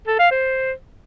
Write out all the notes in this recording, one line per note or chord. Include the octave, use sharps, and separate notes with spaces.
A4
F5
C5